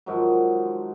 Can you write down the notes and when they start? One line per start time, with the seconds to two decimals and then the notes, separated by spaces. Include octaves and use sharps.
0.06 G#2 D#3 F3 F#3